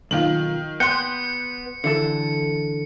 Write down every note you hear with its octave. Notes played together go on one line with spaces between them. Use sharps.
B1 D#3 F4 F#7
B3 G5 C6 F#6 G6 C#7
D3 E3 A4 C#7